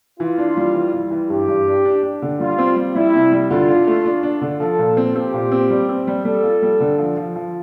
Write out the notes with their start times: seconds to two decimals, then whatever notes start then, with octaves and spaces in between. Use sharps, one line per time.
0.20 E3 F4
0.38 D4
0.57 G3
0.74 E3
0.94 G3
1.11 E3
1.30 G2 G4
1.48 G2
1.67 D4
1.85 D4
2.03 D4
2.22 D3
2.40 G3 F4
2.58 C4
2.76 G3
2.95 G3 E4
3.14 C3
3.32 G3
3.51 D3 F4
3.69 D4
3.87 A3
4.05 D4
4.23 D4
4.41 D3
4.60 F3 A4
4.79 A#2
4.97 C4
5.16 C4 G4
5.34 A#2
5.52 C4
5.70 G3
5.89 C4
6.07 G3
6.25 G3 A4
6.44 F4
6.62 G3
6.80 D3
6.98 F3
7.17 F3
7.36 F3